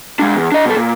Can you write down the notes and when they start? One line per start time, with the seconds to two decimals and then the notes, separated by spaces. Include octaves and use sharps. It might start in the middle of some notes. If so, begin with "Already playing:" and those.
0.19 G#3 D4
0.35 E2
0.52 D4 D#5
0.65 B2 A4
0.76 A#2